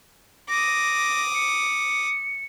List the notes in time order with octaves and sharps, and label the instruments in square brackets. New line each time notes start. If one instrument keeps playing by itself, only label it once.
[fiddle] D6 D#6 [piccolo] A#6
[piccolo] C#7